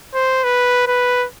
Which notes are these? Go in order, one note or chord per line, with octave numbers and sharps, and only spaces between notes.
C5
B4
B4